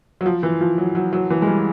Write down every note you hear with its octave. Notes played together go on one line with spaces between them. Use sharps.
F#3
F3
E3
F3
F#3
F#3
F#3
E3
G#3
G3